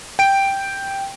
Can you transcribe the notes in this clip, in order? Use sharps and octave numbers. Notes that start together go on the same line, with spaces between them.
G5 D7